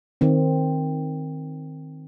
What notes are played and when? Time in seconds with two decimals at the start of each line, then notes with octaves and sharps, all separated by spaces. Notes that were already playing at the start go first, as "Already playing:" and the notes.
0.21 D#3 C4